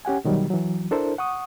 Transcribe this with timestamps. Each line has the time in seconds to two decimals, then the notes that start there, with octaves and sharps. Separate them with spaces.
0.05 C#4 G4 F#5 G#5
0.24 B2 D#3 F#3 G3
0.50 E3 F#3
0.91 D4 E4 A4 A#4 C5
1.18 F#5 C#6 D#6